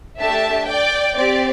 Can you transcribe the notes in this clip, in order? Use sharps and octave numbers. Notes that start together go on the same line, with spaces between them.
A3 D4 G4 E5 A5
D5 G5
C4 G4 D5